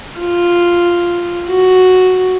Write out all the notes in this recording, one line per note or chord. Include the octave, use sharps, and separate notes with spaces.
F4
F#4